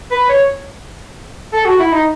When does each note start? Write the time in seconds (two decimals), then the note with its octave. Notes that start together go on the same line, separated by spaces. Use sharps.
0.11 B4
0.29 C#5
1.53 A4
1.66 F#4
1.79 E4
1.92 D#4